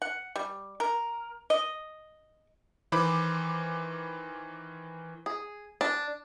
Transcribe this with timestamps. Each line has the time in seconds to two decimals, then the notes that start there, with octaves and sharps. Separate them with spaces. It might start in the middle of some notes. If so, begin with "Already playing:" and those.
0.02 F#5
0.36 G3
0.80 A#4
1.50 D#5
2.92 D#3 E3 C5 B5 D6
5.26 G#4
5.81 D4